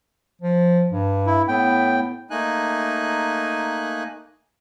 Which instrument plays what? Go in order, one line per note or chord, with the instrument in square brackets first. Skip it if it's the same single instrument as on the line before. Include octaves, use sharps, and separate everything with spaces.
[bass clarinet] F3
G2
[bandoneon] E4
[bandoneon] A2 G5 [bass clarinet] B3
[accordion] A3 A#3 D#4 G#5 F#6